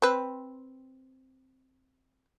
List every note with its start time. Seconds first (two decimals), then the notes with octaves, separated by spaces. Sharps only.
0.02 C4 B4